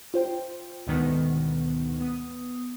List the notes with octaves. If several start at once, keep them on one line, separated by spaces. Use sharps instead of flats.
F4 C5 G5
D2 G#2 B2 D#3 B3
B3 D#6